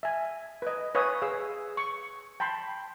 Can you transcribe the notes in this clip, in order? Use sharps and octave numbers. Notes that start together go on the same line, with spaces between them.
E5 G#5
B4 D#5
B4 C#5 F5 G#5 D#6 E6
G#4 B4 F5 E6
C#6
G5 A5 B5 C6